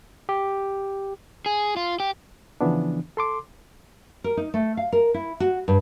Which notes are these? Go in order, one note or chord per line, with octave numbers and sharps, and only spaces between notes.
G4
G#4
F4
G4
C#3 E3 F3 B3 D4
A4 C6 D6
A#4
D#4
A3
F5
A#4
E4
F#4
G2